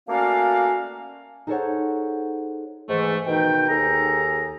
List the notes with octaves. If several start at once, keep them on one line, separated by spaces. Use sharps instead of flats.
A3 A#3 C#4 F#4 D5 F5
D#4 G#4 A4 C5 C#5 F#5
G#2 E3 A3
B2 D#3 D#4 G5
D#2 G#4 A4 A#5